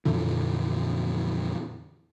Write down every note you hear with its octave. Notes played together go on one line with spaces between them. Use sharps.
F2 A#2 D3 E3